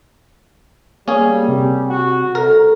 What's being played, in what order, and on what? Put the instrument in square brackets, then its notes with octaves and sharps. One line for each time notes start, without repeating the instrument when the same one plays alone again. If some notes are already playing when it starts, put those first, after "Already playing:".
[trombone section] G3 [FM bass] A#3 [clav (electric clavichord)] C#4 G#4
[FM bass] C3
[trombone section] F#4
[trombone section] C2 [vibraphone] A4 [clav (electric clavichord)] A#4